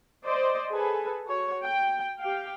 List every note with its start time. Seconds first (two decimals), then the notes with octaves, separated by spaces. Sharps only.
0.24 C5 D5 D#5
0.70 G#4 A4 B4 G#5
1.27 F#4 C#5
1.64 G5
2.19 G4 F5 G5